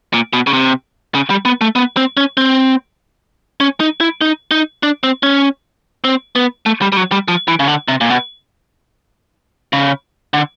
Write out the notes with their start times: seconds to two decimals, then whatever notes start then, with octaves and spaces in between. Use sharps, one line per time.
0.13 A#2
0.33 B2
0.47 C#3
0.53 C3
1.15 C#3
1.30 G3
1.45 B3
1.61 A3
1.76 B3
1.97 C4
2.17 C#4
2.37 C4
3.60 C#4
3.80 D#4
4.00 E4
4.21 D#4
4.51 D#4
4.83 D4
5.04 C4
5.23 C#4
6.04 C4
6.36 B3
6.66 A3
6.82 G3
6.92 G3
6.97 F#3
7.12 G3
7.28 F3
7.48 E3
7.60 C#3
7.68 D3
7.88 C3
8.01 A#2
8.10 B2
9.73 C#3
10.34 D3